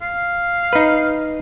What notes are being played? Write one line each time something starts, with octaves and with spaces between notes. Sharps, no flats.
F5
D#4 B4